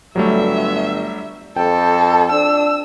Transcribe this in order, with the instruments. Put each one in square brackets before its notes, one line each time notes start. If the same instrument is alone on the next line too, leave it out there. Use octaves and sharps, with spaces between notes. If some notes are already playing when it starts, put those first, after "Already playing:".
[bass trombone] G1 [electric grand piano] F#3 G3 A3 [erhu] E5
[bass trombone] F2 [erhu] A4 [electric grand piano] G5
[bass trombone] D4 [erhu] E6